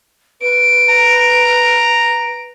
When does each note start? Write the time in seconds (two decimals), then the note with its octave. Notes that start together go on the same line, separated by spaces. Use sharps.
0.42 B4 D7
0.89 A#5